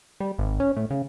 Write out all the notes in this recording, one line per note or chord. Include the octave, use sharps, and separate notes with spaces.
G3
G#1
C#4
A2
C#3